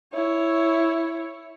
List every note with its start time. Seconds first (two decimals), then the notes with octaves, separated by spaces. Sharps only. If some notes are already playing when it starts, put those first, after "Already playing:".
0.13 E4 C#5